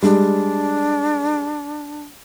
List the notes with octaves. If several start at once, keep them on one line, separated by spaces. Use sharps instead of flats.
G3 G#3 D4